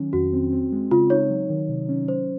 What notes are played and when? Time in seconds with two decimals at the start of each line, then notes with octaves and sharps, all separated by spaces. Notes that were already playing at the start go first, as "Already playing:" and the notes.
Already playing: D#3 F#3 C#4
0.13 F2 F#4
0.33 C4
0.52 C4
0.72 G#3
0.91 C#3 F4
1.10 D#4 C#5
1.30 F#3
1.49 D#3
1.69 C3
1.89 C#4
2.08 F#3 C5